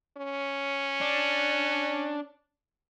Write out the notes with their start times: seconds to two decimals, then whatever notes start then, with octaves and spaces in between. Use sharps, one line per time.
0.17 C#4
1.01 D4